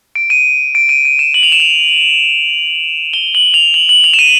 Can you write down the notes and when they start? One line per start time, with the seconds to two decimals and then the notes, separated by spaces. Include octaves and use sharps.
0.15 D7
0.30 D#7
0.75 D7
0.89 D#7
1.05 D#7
1.19 E7
1.34 F#7
1.43 F7
1.52 E7
1.60 F7
3.13 G7
3.35 F#7
3.54 F7
3.74 F#7
3.89 F#7
4.04 F7
4.14 E7
4.19 D#7